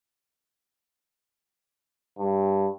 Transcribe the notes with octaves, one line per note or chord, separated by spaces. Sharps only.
G2